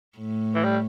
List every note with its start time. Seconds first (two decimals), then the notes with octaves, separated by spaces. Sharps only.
0.18 A2
0.54 E3
0.64 G3